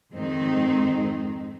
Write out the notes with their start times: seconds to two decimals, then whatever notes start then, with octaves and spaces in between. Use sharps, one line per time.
0.13 F2 G#2 D#3 G#3 C4 D#4